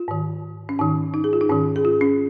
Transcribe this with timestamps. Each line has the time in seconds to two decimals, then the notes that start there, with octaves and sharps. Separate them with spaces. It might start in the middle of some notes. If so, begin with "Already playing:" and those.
Already playing: F4
0.08 G#2 D#3
0.69 C#4
0.79 G#2 D#3 D#4
1.14 D#4
1.24 G#4
1.33 F4
1.41 D#4
1.49 G#2 D#3 C#4
1.76 G#4
1.85 F4
2.01 C#4